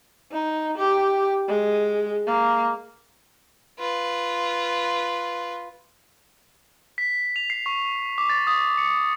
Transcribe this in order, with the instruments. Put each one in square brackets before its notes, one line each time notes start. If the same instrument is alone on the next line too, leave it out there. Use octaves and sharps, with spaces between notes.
[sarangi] D#4
G4
G#3
A#3
[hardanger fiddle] F4 B4
[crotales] B6
F7
C7
C#6
D6
A6
D#6
C#7